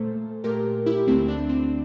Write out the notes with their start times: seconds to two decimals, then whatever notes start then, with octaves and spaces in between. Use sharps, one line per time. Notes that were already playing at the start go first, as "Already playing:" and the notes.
Already playing: A#2 A3 A4 C5
0.44 A#2 A3 G4 A#4
0.86 E4 G4
1.07 D2 D3 A3 C4 E4
1.28 D4
1.49 C4